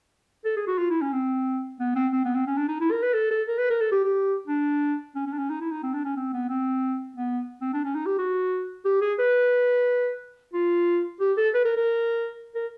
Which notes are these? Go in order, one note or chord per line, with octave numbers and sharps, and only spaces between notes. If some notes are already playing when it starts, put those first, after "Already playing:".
A4
G#4
F#4
F4
E4
C#4
C4
B3
C4
C4
B3
C4
C#4
D4
D#4
E4
A#4
B4
A4
A4
A#4
B4
A#4
A4
G4
G4
D4
C#4
C#4
D4
C#4
D#4
E4
D#4
C4
D4
C#4
C4
B3
C4
B3
C4
D4
C#4
D#4
G4
F#4
G4
G#4
B4
F4
G4
A4
B4
A#4
A#4
A#4